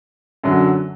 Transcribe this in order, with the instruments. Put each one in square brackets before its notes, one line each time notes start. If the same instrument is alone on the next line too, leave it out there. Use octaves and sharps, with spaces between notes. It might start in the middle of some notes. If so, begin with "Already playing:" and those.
[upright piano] F#2 D3 F#3